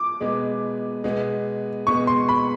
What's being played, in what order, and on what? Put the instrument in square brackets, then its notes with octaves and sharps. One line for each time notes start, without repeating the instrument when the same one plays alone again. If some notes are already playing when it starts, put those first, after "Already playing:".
Already playing: [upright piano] D6
[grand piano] B2 G#3 B3
B2 G#3 B3
[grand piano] B2 G#3 B3 [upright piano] C#6
[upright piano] C6
B5